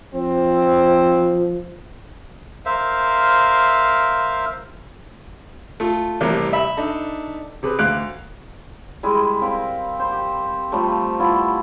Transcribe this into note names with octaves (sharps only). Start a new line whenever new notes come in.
F3 C4
A#4 C5 E5 F5
A3 F4
A1 C3 G3 A#3
E5 B5
D4 D#4 A4
C3 G#4 B4
D2 F5 F#6 D7
G3 G#3 E4
C4 A#4 F5 B5
C5
G4
F3 G3 A3
G3 B3 E4 F4